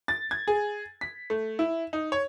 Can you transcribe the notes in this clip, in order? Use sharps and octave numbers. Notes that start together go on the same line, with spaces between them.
A6
G#6
G#4
B6
A3
E4
D#4
C#5